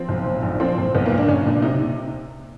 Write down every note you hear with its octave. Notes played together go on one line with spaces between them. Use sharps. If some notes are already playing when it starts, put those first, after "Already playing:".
Already playing: F3 C4
B1
A#2
A#1
F3 C4
A#2
B1 B3
A#3
A#2
D4
B1 C#4
A#2 D4
C3 D#4